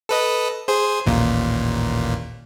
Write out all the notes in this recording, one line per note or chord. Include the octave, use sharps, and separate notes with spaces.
A4 B4 D#5
G#4 C5
A1 D#2 A#2